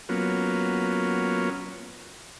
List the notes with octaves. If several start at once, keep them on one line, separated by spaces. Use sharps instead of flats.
F#3 A#3 B3 C#4 F4